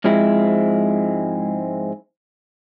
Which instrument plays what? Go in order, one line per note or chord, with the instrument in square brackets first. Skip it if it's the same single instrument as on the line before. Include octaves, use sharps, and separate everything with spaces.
[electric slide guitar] G#2 F3 G#3 C4 E4